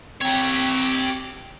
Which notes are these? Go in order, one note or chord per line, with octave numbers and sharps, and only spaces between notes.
C4 G4 C#5